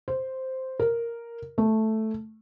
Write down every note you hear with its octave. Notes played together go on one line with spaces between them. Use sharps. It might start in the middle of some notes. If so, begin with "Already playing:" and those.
C5
A#4
A3